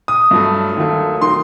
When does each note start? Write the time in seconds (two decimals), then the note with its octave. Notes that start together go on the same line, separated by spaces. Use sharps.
0.08 D#6
0.31 G2 F#3 A3
0.76 D#2 D#3 F#3 A3
1.21 D#3 F#3 C6